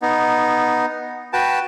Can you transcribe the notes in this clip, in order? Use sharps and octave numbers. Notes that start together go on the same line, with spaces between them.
B3 D#4
F#4 B4 G5 A5